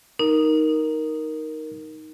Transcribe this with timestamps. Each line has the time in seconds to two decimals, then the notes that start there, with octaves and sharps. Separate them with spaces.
0.19 D#4 A#4